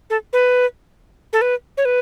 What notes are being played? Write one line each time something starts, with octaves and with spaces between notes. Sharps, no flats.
A4
B4
A4
B4
C#5
B4